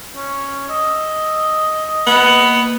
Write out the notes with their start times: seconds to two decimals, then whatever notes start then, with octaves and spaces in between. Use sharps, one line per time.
0.16 C#4
0.69 D#5 E6
2.07 A#3 B3